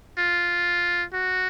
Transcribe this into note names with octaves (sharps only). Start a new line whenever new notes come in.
F4
F#4